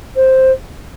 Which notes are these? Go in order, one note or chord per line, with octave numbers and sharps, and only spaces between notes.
C5